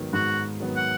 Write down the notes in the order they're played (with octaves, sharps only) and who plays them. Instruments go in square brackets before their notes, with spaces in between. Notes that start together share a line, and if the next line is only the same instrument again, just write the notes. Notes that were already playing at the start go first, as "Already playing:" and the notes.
Already playing: [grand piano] G#2 D#3 F#3 B3
[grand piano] G#2 [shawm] F#4
[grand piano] D#3 F#3 B3
[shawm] F#5